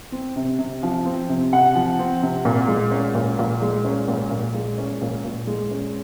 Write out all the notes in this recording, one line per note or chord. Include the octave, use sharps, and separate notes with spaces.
C4
C3
C3
F3
C4
C3
C3 F#5
F3
C4
C3
A#2
G#3
C#4
A#2
A#2
G#3
C#4
A#2
A#2
G#3
C#4
A#2
A#2
G#3
C#4